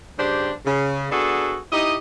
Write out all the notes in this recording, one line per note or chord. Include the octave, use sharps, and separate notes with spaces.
G2 C#3 D4 G4 C5
C#3
B3 D4 F#4 G#4 A4
D#4 E4 G4 D#5